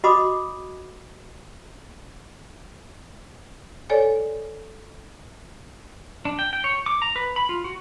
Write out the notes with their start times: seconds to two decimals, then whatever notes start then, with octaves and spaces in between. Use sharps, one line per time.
0.04 F#4 D#5 B5 C6 D6 D#6
3.90 A4 C#5 D5 G#5
6.25 D4
6.39 G5
6.53 G5
6.64 C#5
6.86 D6
7.02 A#5
7.16 B4
7.36 B5
7.49 F4
7.64 F#4